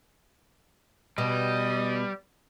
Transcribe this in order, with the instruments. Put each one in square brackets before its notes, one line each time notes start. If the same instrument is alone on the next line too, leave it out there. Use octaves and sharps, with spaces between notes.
[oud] B2 [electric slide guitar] G3 [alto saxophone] D#5